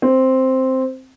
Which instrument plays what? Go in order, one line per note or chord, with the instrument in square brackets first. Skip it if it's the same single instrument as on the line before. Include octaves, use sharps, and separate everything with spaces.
[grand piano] C4